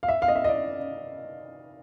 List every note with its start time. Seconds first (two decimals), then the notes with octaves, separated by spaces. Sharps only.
0.03 F5
0.08 E5
0.22 F5
0.28 D#5
0.35 E5
0.44 D#5
0.48 D5